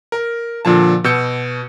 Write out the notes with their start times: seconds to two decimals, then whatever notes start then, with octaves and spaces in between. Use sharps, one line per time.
0.12 A#4
0.65 A#2 D3 F3 A5
1.04 B2 E6 G6 C#7